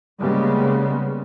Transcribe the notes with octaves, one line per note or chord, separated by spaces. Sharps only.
C#3 G3 G#3 A#3 B3